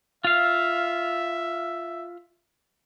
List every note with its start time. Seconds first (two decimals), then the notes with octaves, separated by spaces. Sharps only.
0.24 F4 E5 F5